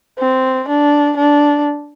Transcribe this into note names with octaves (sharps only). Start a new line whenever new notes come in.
C4
D4
D4